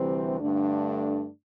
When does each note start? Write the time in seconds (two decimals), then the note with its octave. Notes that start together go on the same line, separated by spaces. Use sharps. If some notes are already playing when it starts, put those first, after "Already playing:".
Already playing: D2 C3 E3 G3 C4
0.39 G2 D3 A3 D4